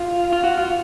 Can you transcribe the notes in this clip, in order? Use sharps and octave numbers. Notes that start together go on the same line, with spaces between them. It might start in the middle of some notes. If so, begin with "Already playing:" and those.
Already playing: F4
F4
F#4
F4